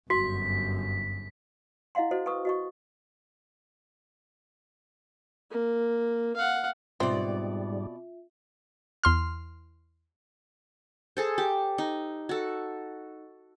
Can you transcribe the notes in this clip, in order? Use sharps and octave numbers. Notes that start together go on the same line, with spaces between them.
G1 F#2 F#4 C6 B6
E4 D#5 F5 F#5 C6
F#4 A4 C5 D#5
A4 B4 C#6 D#6
F#4 D#5 C#6
A#3
F5 F#5
G#2 B2 G3 C4 F4 D5 E5
E2 C6 F6
G#4 A4 C5
G4
D#4
F#4 A4